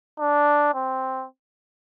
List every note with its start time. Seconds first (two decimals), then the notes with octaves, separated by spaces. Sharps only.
0.19 D4
0.74 C4